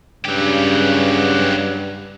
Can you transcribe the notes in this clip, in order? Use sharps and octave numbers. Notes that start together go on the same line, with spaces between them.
G2 C#3 F#3 G4